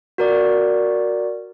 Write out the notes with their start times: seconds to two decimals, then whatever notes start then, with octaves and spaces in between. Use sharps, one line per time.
0.18 F#4 A#4 D5